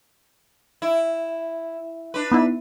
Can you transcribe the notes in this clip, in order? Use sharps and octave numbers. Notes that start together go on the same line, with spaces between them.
E4
D4 B4
B3 D#4 E4